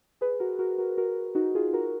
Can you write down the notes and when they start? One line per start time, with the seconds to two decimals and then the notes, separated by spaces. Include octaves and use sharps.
0.21 G#4 B4
0.40 F#4 A#4
0.59 F#4 A#4
0.78 F#4 A#4
0.97 F#4 A#4
1.35 D#4 F#4
1.55 F4 G#4
1.73 F#4 A#4